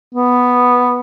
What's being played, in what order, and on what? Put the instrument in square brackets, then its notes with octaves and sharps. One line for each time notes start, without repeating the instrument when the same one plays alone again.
[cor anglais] B3